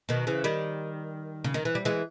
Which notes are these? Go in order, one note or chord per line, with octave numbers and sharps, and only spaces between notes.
B2 D#3
C#3 E3
D#3 G3
C#3
D#3
E3
G3
E3 G#3